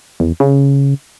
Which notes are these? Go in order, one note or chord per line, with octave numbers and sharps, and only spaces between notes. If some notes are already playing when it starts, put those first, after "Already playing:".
E2
C#3